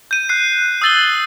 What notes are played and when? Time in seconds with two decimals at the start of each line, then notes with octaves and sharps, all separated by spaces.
0.11 G6 D#7
0.29 F#6 C7
0.82 D#6 E6 A6 F#7 G7